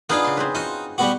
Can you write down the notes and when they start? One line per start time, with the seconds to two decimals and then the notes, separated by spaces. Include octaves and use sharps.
0.10 B3 D4 D#4 F4 G#4
0.24 C#3 C6
0.37 C4 G#4 B4
0.55 D#4 F4 F#4
0.98 G3 B3 F#4